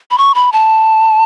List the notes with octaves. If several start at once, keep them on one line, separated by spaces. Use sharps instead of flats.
B5
C#6
B5
A5